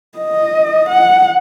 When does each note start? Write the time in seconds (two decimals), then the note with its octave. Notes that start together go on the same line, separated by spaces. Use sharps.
0.18 D#5
0.89 F#5